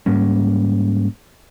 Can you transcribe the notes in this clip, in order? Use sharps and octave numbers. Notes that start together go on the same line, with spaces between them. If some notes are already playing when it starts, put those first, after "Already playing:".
G#2 G3 A#3 C#4